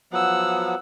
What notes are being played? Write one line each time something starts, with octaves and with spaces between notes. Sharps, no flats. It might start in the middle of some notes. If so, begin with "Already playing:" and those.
F3 F#3 B3 F#5 E6